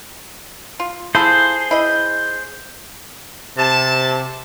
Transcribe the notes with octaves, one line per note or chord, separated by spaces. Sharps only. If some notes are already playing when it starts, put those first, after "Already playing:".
F4
E4 F4 G#4 A4 C5
E4 D#5
C3 A5